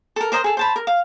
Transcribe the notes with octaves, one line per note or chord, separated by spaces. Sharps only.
A4 A#4
A#4 C5 D#5 A#5
G#4 A4
C5 A5 B5
A#4
F5